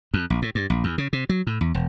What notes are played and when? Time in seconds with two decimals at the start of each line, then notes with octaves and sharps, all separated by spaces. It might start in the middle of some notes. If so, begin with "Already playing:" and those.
0.14 F2
0.30 A#1
0.42 A2
0.55 G2
0.70 A#1
0.84 E2
0.98 C#3
1.13 C3
1.29 F#3
1.47 A2
1.61 E2
1.74 E1